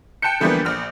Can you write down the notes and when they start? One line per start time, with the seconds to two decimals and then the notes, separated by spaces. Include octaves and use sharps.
0.22 G5 A5 F#6 G6 C#7
0.40 D3 E3 F3 G3 A#3 B3
0.65 A#1 F6